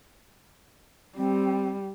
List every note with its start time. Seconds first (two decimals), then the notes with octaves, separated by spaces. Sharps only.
1.17 G3 C4